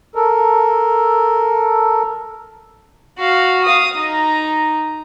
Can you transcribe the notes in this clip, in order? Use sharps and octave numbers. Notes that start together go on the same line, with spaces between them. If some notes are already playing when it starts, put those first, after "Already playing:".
A4 A#4
F#4 F5
F5 D#6
D#4 A#5